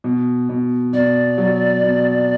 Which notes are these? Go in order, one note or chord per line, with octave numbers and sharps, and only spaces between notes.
B2
B2
B2 D5
F#3
B2